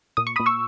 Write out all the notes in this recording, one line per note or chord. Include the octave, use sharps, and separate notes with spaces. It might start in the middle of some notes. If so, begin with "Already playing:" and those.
A#2 D#6
C#6
A#2 B5 D#6
C#6 E6